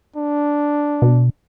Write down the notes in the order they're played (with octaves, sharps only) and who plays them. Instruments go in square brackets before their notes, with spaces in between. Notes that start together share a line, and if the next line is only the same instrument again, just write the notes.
[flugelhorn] D4
[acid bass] B2